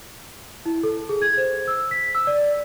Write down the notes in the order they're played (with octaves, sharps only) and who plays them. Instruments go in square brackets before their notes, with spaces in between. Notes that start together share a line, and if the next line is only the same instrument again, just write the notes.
[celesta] E4
A4
G#4
G#6
C5
E6
B6
E6
D5